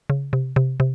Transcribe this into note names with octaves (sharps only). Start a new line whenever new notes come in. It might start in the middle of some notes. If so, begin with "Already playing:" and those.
C#3
C3
C3
C3